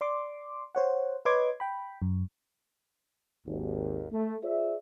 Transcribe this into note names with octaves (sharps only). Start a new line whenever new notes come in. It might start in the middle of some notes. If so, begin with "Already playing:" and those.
D5 C6 D6
C5 C#5 F#5
B4 C#5 D#5 C6 D6 G#6
G5 B5
F#2
G#1 D#2
A3
F4 G#4 C5 D5 E5